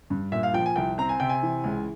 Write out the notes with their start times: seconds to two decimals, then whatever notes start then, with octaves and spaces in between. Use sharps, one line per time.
0.10 G2
0.32 A#2 E5
0.43 F5
0.54 F3 G5
0.66 G#5
0.76 C2 G5
0.98 C4 A#5
1.09 G#5
1.20 C3 G5
1.29 G#5
1.43 E3
1.64 C#2